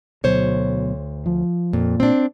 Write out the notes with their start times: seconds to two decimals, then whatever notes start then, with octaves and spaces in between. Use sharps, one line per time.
0.24 D2 B2 F#3 C5 C#5
1.26 F3
1.73 F2 A#2
2.00 C4 D4